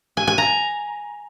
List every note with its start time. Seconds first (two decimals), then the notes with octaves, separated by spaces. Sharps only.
0.17 G#5
0.27 G#5
0.38 A#5